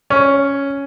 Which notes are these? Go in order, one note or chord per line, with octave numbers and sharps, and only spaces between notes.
C#4